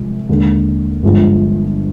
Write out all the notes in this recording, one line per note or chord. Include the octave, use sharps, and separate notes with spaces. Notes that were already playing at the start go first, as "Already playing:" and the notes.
Already playing: C2 C3 F3 G#3
D#2 D3 G#3
G1 G2 F3 G#3